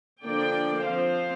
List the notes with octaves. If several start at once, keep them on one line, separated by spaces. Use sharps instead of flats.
D3 F3 A#3 D4 D5 G5
F3 C4 C5 F5